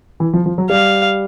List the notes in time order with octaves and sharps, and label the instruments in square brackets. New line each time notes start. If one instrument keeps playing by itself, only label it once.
[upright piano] E3
F3
F3
F#3
[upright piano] G3 [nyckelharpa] F5